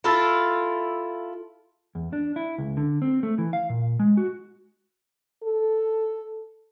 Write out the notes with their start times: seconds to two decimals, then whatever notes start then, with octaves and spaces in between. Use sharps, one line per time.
0.04 E4 F4 A4
1.95 E2
2.13 D4
2.36 E4
2.58 C#2
2.77 D3
3.02 C4
3.23 A3
3.38 E3
3.53 F5
3.70 A#2
3.99 G#3
4.17 F#4
5.43 A4